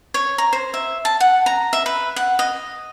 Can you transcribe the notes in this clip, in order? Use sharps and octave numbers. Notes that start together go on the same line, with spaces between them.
C#5
A#5
C5
E5
A5
F#5
A#5
E5
B4
F#5
D#5